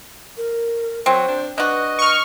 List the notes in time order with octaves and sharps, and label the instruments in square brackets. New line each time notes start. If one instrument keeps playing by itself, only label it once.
[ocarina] A#4
[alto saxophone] F#3 [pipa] C4 [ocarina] C5
[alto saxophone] D4
[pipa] D4 F#4 [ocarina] B4 [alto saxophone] D#5
[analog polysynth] C#6 F6